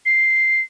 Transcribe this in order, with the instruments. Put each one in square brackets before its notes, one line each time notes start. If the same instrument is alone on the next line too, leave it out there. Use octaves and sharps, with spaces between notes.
[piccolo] C7